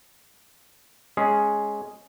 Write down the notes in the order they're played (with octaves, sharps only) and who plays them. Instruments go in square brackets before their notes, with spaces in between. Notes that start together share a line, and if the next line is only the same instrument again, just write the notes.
[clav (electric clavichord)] G#3 C#4 G#4